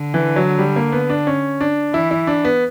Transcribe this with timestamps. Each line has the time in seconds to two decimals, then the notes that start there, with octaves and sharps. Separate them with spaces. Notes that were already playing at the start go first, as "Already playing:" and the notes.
Already playing: D3
0.14 E3
0.36 F#3
0.59 G3
0.76 A#3
0.92 B3
1.10 D4
1.27 C#4
1.61 D4
1.93 E3 E4
2.11 E4
2.27 D4
2.45 B3